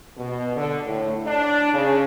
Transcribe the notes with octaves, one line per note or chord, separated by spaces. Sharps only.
B2
D3
A2
D4
C#3